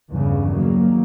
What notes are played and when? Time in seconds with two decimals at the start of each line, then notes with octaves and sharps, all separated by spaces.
0.10 E2 G2 C#3 E3
0.49 D#3 F#3 A#3